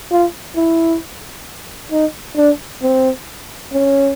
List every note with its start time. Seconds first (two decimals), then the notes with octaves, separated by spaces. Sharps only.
0.11 F4
0.56 E4
1.92 D#4
2.36 D4
2.82 C4
3.73 C#4